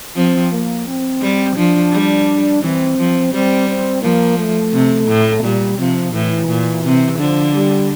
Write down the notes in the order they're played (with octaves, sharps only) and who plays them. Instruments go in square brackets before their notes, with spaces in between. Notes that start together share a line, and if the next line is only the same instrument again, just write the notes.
[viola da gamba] F3 [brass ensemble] C4
[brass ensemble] A#3
C4
[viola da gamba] G3
[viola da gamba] F3 [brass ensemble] D4
[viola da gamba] G3
[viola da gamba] E3 [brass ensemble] C4
[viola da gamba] F3
[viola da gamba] G3 [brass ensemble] C4
[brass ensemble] C4
[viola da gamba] F3 [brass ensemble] A#3
[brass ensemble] A3
[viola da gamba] C3
A2
[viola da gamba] A#2 [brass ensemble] G3
[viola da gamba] C3 [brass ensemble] F3
[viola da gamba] A2 [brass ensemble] E3
[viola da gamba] A#2
C3
[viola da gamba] D3 [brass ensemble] F3
[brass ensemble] G3